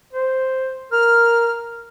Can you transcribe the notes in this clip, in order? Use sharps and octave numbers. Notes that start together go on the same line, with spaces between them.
C5
A#4 F6